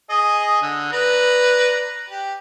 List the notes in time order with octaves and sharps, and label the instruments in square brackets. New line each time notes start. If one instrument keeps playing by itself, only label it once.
[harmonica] G#4 D#5
D3
B4 D5 A#5
G4